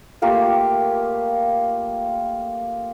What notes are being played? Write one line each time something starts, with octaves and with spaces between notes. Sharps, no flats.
A3 A#3 F4 G4